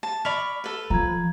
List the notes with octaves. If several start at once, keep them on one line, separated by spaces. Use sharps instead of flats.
A5
D5 B5 C#6 F6 B6 F7
A4 B4
F3 A#5 G#6